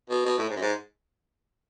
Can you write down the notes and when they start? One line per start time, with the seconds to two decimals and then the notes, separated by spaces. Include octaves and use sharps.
0.10 B2
0.26 B2
0.38 A2
0.49 G#2
0.56 F#2
0.61 G#2